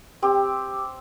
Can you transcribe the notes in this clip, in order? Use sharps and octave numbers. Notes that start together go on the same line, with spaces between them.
C4 G4